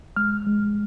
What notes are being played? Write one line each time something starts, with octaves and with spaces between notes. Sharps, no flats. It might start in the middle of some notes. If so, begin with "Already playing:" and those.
G#3 F6
G#3